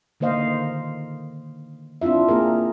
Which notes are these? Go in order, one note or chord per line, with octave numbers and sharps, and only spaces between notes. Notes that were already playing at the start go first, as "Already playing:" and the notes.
D3 D#3 A#3 C5 D#5 F5
C4 D4 E4 F4 E5
A#3 G#4 A#4